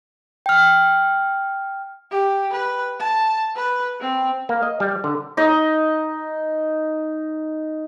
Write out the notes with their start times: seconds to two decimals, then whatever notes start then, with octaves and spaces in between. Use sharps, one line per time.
0.46 G5 F6
2.11 G4
2.53 B4
3.00 A5
3.56 B4
4.00 C4
4.49 A#3
4.63 D#5
4.80 G3
5.04 D3
5.37 D#4 D#5